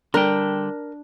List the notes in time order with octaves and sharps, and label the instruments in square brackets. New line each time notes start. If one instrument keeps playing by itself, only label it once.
[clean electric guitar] D3 G3 G5 [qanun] D4 [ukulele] A#4